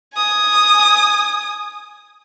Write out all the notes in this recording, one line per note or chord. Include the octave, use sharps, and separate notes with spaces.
G#5 D#6